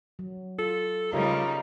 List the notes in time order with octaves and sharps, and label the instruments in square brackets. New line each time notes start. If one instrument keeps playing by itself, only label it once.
[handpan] F#3
[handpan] F4 [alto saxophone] A4
[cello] C#3 G3 [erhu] D#4 [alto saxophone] F4 [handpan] G4 A#4 D5